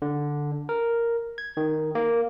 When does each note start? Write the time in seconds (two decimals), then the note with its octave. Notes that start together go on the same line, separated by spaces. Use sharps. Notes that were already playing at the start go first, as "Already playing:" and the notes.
0.02 D3
0.69 A#4
1.38 G#6
1.57 D#3
1.95 A#3